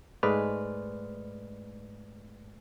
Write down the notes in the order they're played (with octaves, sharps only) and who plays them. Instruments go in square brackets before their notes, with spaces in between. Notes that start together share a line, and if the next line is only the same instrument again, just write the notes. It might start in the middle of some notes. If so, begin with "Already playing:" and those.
[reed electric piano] G#2 G#3 A3 B4 D5 F6